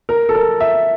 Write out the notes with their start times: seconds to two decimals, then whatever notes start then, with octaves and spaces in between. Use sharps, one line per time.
0.09 A#4
0.29 A4
0.35 A#4
0.60 E5